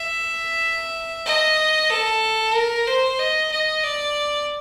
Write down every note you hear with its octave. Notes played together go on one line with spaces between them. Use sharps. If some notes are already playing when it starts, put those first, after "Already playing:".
Already playing: E5
D#5
A4
A#4
C5
D#5
D#5
D5